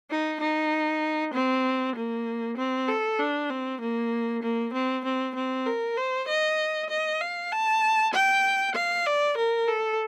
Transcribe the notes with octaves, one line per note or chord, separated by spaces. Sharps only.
D#4
D#4
C4
A#3
C4
A4
D4
C4
A#3
A#3
C4
C4
C4
A#4
C5
D#5
D#5
F5
A5
G5
F5
D5
A#4
A4